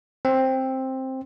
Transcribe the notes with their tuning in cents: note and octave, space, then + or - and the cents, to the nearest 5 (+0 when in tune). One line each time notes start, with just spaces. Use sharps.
C4 +10